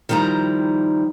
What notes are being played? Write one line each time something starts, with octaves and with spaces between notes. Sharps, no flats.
D#3 F3 G3 E4 A#5